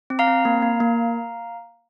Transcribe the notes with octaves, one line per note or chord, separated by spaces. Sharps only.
C4
F5 A#5
C4
A#3
A#3
A#3